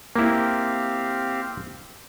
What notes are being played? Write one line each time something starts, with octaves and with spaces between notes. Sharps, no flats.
A#3 C4 E4 G4 F5